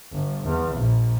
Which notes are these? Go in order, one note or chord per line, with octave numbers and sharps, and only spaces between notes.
G1
E2
A#1